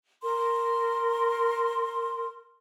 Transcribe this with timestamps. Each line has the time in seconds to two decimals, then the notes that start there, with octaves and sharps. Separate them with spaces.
0.23 A#4 C6